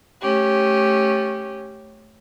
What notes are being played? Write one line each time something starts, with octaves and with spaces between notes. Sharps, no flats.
A3 C#4 G4